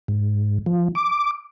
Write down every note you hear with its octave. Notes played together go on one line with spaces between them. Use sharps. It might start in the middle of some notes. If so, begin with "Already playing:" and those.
G#2
F3
D6